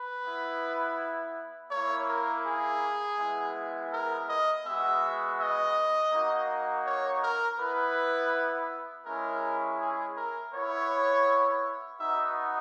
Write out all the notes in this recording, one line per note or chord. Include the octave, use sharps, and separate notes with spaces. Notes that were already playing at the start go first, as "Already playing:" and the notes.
Already playing: B4
B3 E4
A#3 E4 C#5
A#4
G#4
G#3 B3 E4
A#4
D#5
G#3 B3 F#4 E5
D#5
A#3 D#4 F#4
C#5
A#4
B3 E4 B4
G#3 C#4 E4 A#4
G#4
A#4
B3 E4 C#5
B3 D#4 F#4 E5